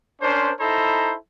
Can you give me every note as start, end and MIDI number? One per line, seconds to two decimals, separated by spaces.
0.22 0.52 61
0.22 0.52 62
0.22 0.52 70
0.22 0.52 72
0.60 1.15 63
0.60 1.15 64
0.60 1.15 69
0.60 1.15 72
0.60 1.15 82
0.60 1.15 83